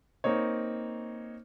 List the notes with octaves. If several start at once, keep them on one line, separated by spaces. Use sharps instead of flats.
A#3 C4 D#4 C#5